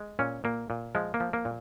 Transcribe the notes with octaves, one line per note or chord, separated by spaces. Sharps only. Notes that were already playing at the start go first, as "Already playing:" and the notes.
Already playing: G#3
A#2 C#4
A#2 A#3
A#2
F3 G#3
A#3
F3
A#3
A#2